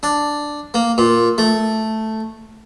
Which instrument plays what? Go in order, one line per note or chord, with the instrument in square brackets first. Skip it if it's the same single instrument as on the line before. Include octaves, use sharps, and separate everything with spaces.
[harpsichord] D4
A#3
A#2
A3